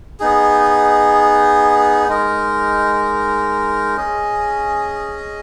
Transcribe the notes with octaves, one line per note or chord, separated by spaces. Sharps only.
B3 D#4 G#4
G#3 D#4 A#4
C#4 G#4 D#5